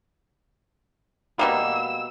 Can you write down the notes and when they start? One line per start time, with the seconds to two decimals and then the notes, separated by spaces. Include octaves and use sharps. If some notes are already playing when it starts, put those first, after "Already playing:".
1.39 B2 G3 A#3 E6